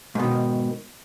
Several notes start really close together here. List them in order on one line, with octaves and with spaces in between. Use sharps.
G#2 B2 D#3